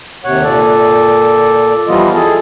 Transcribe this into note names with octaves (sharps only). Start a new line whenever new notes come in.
D#2 C3 C#5 F#5
A#2 A4 D5
E3 F3 G3 B3 F4 D#5
G#4 A4 A5